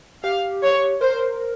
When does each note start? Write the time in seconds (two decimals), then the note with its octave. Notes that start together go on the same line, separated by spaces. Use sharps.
0.23 G4 F5
0.63 C#5
1.01 A#4 C5